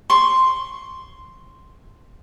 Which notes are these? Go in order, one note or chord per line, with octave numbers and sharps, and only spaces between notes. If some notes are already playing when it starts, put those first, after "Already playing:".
C6 C#6